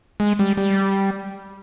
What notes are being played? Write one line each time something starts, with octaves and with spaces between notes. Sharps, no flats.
G#3
G3
G3